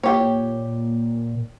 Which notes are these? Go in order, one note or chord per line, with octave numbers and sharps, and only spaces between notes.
A#2 G4 C#5